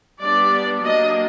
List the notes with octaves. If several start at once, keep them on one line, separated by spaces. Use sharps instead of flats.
G3 B3 D4 D5
F#3 A#3 D4 D#5